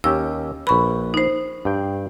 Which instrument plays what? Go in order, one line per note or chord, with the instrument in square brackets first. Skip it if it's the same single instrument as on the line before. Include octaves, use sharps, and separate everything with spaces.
[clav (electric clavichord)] D#2 C#4 G4 [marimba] E6
[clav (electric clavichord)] A#1 B4 [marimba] B5 C#6
[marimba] D#4 C5
[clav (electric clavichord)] G2 G5